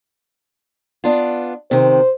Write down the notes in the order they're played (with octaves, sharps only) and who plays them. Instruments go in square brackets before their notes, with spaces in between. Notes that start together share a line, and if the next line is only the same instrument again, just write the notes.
[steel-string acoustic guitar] B3 D4 F4
[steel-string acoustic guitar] C3 D#3 [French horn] C5